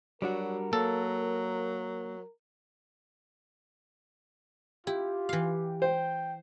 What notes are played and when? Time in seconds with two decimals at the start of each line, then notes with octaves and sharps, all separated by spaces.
0.22 F#3 G3 D4 F#4 A#4
0.73 F#3 A#3 A4
4.87 E4 F4 G4
5.29 E3 F5
5.82 C5 G5